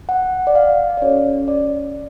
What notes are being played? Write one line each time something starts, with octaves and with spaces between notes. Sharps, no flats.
F#5
D5
F5
D5
C#4 F#4 A4 C#5
D5